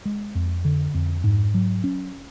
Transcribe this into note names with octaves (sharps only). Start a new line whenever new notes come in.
G#3
F2
D3
F2
G#2
F#3
C#4